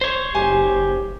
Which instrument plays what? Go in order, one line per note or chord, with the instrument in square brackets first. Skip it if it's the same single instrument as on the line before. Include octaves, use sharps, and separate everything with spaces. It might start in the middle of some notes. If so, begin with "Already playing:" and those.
[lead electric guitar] C5 C#5
[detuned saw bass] F#1 [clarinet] G4 [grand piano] G#5